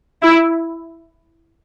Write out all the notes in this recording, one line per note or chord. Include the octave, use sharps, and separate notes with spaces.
E4